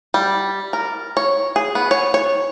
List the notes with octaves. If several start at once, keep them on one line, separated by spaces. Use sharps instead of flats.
G3
A#4
C#5
G#4
B3
C#5
C#5